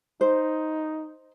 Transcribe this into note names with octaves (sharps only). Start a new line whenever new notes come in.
D#4 C5